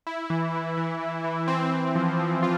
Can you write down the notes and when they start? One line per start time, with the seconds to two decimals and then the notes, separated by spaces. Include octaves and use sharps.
0.07 E4
0.30 E3
0.53 E3
0.77 E3
1.01 E3
1.24 E3
1.48 C4
1.72 C4
1.95 F3
2.19 F3
2.43 F4